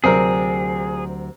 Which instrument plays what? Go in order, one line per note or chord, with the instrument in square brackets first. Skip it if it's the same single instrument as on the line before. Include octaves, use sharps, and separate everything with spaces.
[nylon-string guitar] D2 F#3 D5 [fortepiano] C3 C4 A#4 [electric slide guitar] G#4